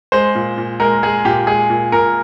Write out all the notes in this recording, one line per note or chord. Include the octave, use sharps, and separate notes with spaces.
G#3 C5
A#2
A#2
G#3 A#4
G#3 G#4
A#2 G4
G#3 G#4
A#2
A#2 A#4